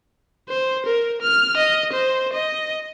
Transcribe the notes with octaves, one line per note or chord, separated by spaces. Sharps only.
C5
A#4
F6
D#5
C5
D#5